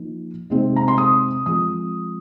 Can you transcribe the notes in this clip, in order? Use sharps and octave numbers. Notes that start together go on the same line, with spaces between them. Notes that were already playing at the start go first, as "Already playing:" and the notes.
Already playing: F3 A#3 D#4
C3 G#3 C4 D#4
A#5
C6
D#6
F3 G#3 C4 D#6